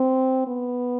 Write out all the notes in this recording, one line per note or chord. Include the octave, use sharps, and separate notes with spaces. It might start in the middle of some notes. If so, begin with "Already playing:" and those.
Already playing: C4
B3